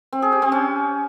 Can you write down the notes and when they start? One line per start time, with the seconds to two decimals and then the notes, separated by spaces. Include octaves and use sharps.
0.12 C4
0.22 G#4
0.32 G4
0.42 C4
0.52 C#4